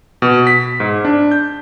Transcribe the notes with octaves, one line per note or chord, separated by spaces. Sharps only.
B2
B6
G#2
D4
G6